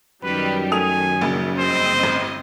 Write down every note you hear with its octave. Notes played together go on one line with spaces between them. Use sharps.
F#2 D#3 G3 G4 B4
D#3 A3 G#5 D#6 F7
A#1 C#3
G1 C4 C5 D#5
A1